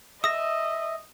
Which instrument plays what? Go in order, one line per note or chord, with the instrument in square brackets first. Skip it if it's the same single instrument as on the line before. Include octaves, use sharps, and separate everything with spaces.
[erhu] D#5 [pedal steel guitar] E5 [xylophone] D#6 A#6